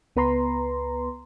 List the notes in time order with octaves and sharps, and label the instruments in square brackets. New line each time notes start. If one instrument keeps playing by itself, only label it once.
[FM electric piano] C#2 B3 B4 A#5 C6